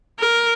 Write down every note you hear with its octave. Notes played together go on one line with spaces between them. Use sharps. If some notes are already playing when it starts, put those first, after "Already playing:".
A#4